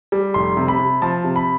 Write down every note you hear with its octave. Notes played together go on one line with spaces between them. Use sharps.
G3
F1 C6
C3
B5
C3
F3 A5
C3
B5